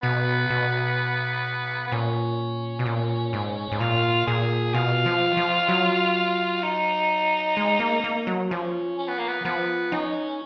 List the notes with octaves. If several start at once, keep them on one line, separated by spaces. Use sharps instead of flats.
B2 B3
B2
B3
A#2 C#4
B2
A#2
G#2
G#2
A#2 F4
A#2 G#4
B2 F4
F3
F3
F#3
D#4
G#3
A#3
A#3
F#3
F3 C#4
C#4
B3
A#3
B3
F3 B3
C#4 D#4